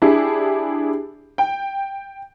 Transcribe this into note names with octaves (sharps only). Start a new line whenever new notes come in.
D4 E4 G4 G#4
G5